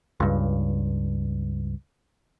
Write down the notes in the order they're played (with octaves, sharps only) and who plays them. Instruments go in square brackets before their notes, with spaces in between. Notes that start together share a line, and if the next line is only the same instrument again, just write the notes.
[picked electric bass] C#2 G2